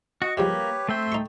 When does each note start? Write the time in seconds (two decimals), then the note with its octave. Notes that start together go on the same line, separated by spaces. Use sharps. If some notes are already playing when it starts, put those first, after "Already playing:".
0.22 F#4 D#5
0.37 F3 G3 G#3 A#3 G4 B4 C#5
0.89 A3 C4 E5 G5 C6
1.12 D#4 C#6